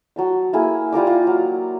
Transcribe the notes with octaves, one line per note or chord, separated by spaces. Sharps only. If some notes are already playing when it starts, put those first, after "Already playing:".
F#3 A5 C6
A#3 E4 G#4
G3 F4 A#5 D6
F4
F#3